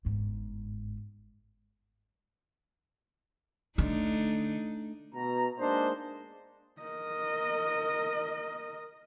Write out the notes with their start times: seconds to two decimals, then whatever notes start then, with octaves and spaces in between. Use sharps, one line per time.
0.05 G1 G#2
3.78 D3 A3 D4 D#4
5.15 B2 A#5
5.59 G#3 A#3 D4 D#4 C5
6.82 A#4 D#5